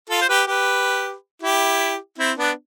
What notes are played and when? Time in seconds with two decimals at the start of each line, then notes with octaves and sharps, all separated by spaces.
0.10 F4 A4
0.22 C5
0.29 G4 B4
0.47 G4 B4
1.42 E4 G4
2.18 C4 E4
2.38 B3 D4